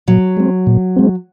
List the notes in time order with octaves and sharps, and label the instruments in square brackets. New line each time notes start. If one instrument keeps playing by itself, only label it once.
[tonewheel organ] A#2 [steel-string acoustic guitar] F#3
[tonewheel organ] G#3 C4
A#2
G#3 C4